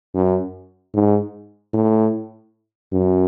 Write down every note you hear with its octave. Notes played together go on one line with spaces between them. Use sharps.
F#2
G#2
A2
F#2